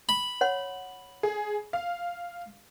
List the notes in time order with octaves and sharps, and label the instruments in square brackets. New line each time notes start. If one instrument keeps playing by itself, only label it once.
[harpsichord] B5
[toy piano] C#5 F#5 C6
[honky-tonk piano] G#4
F5